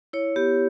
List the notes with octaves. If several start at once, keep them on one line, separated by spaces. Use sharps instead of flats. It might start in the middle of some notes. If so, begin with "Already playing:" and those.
E4 C#5
B3 G4